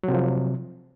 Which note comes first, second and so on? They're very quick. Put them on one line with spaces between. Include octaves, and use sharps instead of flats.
F#3 C3 F3